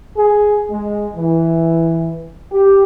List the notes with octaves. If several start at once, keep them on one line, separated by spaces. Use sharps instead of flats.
G#4
G#3
E3
G4